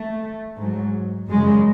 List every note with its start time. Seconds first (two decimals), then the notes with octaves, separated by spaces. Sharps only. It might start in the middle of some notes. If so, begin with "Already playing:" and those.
Already playing: A3
0.57 G#2 F#3
1.29 F#2 C#3 F#3 G#3